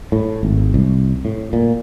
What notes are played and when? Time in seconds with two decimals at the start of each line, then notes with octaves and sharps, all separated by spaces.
0.12 A2
0.43 G#1
0.74 C2
1.25 A2
1.53 A#2